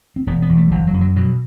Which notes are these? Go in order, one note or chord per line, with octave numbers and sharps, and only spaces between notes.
C4
E1 B3
B3
E2
A3
G3
F#1 F#3
F#3
F#2
F#3
B2 F#3